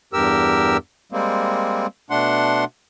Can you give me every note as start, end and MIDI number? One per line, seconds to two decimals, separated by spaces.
0.13 0.77 40
0.13 0.77 43
0.13 0.77 67
0.13 0.77 70
0.13 0.77 88
1.12 1.87 55
1.12 1.87 56
1.12 1.87 58
1.12 1.87 60
2.10 2.64 47
2.10 2.64 57
2.10 2.64 62
2.10 2.64 78
2.10 2.64 84